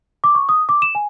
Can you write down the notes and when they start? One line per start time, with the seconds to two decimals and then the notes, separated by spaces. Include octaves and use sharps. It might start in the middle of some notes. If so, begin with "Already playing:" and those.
0.24 D6
0.35 C#6
0.49 D#6
0.69 D6
0.82 E7
0.95 G#5